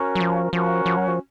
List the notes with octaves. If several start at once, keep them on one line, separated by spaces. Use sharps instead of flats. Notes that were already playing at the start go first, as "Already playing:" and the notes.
Already playing: C#4 F#4 A#4
F#3
F3
F3 C#4 F#4 A#4
F3
F#3
F3